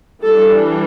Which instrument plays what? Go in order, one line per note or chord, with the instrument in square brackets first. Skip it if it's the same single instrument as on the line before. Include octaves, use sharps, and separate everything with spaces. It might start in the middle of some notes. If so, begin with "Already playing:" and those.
[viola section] E3 G3 D4 A4